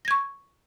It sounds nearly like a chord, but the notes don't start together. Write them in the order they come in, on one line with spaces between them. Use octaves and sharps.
A#6 G#6 C#6